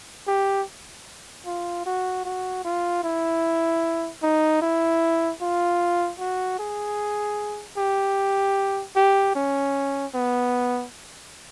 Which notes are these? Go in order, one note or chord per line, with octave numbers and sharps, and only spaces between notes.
G4
F4
F#4
F#4
F4
E4
D#4
E4
F4
F#4
G#4
G4
G4
C#4
B3